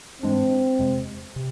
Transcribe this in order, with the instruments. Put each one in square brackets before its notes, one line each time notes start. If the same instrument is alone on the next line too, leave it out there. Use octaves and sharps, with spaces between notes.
[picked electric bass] G#2 E3 G#3 D4 [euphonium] C4
[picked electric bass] F2 C3 G#3
C3